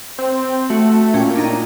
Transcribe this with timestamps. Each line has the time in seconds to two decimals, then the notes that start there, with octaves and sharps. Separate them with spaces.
0.18 C4
0.70 A3 F#4
1.14 A#2 C#4 G5
1.36 D4 D#4 A#5